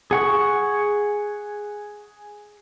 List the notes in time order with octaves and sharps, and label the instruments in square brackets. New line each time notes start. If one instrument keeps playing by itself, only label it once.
[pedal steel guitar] G#4 F#5 C#6